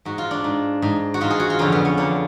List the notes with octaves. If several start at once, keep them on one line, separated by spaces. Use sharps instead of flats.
G#2 F#4
F4
D4
G#2
G#2
F#4
G#2 F4
G#4
F#4
F4
F2 D3 C#4
B3
C#4
F2 D3 D4